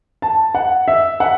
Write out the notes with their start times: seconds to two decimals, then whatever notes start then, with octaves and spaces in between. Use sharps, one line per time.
0.22 A5
0.55 F#5
0.88 E5
1.20 F#5